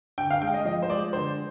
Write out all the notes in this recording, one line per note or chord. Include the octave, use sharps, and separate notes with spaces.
D3 G5
F5
G#3 G5
D#5
F3 D#5
C5
G#3 D5
D3 C5